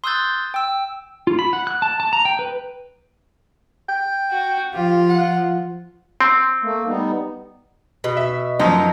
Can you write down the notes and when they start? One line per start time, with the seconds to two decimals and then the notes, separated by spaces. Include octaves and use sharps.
0.04 C6 D#6 E6 F#6 G6 A6
0.54 G5 E6
1.27 F4
1.39 B5
1.53 F#5
1.67 F#6
1.82 A5
2.00 A5
2.13 A#5
2.25 G5
2.39 B4
3.89 G5
4.31 F#4
4.74 F3 F4 G4
5.10 F#5
6.21 C4 C6
6.63 A3 A#3
6.86 G3 B3 D#4
8.04 B2
8.17 E5
8.60 F#2 F3 D#4